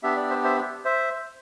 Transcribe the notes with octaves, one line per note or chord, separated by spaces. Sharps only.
B3 D4 G4 E5
D5
C5 E5
C5 E5
C5 E5